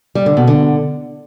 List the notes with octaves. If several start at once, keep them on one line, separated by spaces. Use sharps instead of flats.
G3
D3
B2
D3